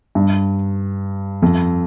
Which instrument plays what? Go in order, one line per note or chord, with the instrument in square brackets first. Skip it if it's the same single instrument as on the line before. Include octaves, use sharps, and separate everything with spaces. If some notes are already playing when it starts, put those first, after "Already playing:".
[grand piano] G2
F2